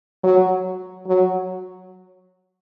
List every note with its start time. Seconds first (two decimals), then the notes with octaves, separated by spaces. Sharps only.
0.23 F#3
1.07 F#3